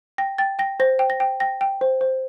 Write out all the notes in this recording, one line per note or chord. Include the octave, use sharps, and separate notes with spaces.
G5 A#6
G5 A6
G5 A#6
C5 A#6
G5
A#6
G5
G5 A#6
G5
C5
C5